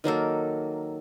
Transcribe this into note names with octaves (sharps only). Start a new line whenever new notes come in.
D#3 F#3 A#3 A4